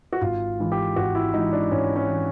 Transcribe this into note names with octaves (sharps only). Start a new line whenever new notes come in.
F#4
G#1 F4
G#2 E3
G4
G#1 F#4
E4
G#2 E3 D#4
D4
G#1 C#4
C#4
E3